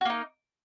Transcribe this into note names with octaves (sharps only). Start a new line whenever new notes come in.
A#3 D#4 F#4